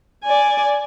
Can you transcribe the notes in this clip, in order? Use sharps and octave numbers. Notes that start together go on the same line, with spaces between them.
D5 G#5